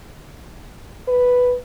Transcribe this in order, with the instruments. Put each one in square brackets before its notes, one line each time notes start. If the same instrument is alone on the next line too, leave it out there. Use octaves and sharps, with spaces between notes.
[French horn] B4